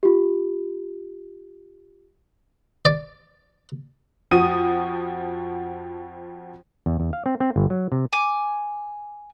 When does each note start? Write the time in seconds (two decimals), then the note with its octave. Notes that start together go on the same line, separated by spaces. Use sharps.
0.03 F4 G4
2.85 D5
4.31 F2 F3 F#4 D#6 D#7
6.86 E2
7.00 E2
7.13 F5
7.26 C4
7.40 C4
7.56 G1
7.70 F#3
7.92 C3
8.13 G#5 D6